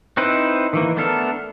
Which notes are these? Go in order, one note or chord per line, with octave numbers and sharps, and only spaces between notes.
C4 D#4 E4 B4 C5
D#3 E3 A#3
A3 B3 D4 A4 A#4